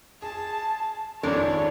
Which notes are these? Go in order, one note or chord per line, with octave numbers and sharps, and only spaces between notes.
G#4 A5
G#1 F2 G#3 D4 A4 A#4 C#5